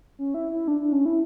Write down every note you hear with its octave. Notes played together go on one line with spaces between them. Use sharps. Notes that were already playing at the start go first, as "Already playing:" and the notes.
C#4
E4
E4
D4
D4
C#4
E4